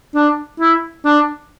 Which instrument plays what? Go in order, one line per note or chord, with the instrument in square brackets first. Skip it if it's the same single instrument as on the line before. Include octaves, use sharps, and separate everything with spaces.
[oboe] D4
E4
D4